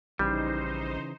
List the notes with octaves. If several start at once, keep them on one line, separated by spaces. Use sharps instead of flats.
A#1 C#3 E3 G3 D#4 C5